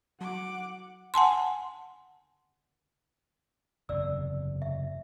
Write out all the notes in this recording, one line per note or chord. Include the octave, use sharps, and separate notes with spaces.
F#3 F#5 D6
F#5 G#5 A5 C6
F#1 E2 C3 D5 E6
E5